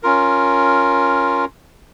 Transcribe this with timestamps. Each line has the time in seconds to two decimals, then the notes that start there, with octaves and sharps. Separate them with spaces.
0.03 C#4 F4 A#4